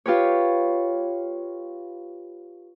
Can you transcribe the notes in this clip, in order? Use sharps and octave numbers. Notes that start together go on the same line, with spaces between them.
F4 G4 B4 C#5